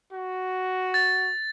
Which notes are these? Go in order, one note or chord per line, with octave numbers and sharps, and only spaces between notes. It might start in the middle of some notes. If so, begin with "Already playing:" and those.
F#4
A6